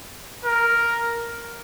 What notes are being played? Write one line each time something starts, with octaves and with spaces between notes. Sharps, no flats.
A#4